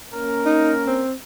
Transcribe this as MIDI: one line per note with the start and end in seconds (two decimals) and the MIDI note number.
0.14 1.03 58
0.14 1.03 61
0.14 1.03 70
0.46 0.73 63
0.87 1.13 60